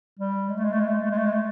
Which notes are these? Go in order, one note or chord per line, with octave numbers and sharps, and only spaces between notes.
G3
G#3
A3
G#3
A3
G#3
A3
G#3
A3
G#3
A3
G#3
A3